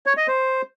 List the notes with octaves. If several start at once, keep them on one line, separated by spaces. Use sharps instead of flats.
C#5
D#5
C5